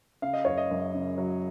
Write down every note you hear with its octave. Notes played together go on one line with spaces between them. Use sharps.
C#3 F5
D#5
F#1 C#5
D#5
F#2
C#3
F#3